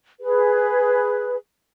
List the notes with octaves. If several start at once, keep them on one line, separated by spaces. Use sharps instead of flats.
G#4 B4